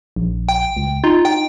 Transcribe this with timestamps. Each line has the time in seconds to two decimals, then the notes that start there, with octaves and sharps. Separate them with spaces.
0.16 A#1
0.49 G5
0.77 C#2
1.04 D#4 F4
1.25 G5